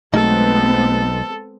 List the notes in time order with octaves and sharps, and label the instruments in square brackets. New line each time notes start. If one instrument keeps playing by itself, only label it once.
[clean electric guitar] B1 F#3 D#4 [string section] G#3 B3 C4 [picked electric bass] A3 [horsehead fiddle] A4